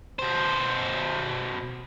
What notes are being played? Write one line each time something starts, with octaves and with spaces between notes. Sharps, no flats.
B2 C5